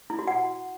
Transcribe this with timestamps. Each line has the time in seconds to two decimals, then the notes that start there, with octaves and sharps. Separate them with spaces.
0.10 E4
0.19 F#4
0.27 F#5